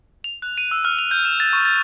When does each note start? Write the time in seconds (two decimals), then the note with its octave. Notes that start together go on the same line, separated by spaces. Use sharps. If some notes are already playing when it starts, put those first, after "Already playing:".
0.24 F7
0.42 F#6
0.58 D#7
0.71 E6
0.85 F6
0.99 F7
1.11 G6
1.25 E7
1.40 A6
1.53 C#6
1.65 A6